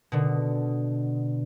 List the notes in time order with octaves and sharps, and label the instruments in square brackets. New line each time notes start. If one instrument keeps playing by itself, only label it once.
[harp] B2 D3